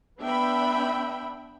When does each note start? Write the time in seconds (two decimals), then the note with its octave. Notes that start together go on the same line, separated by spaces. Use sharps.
0.20 B3 D4 E5 G5 B5